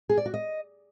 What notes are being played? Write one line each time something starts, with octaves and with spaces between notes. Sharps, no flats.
G#4
D5
F#4
D#5